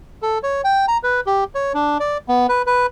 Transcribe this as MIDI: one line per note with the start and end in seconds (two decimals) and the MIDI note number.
0.22 0.38 69
0.43 0.61 73
0.64 0.86 79
0.88 0.97 82
1.03 1.20 71
1.26 1.44 67
1.55 1.72 73
1.74 1.98 62
2.00 2.18 74
2.28 2.47 59
2.49 2.62 71
2.66 2.86 71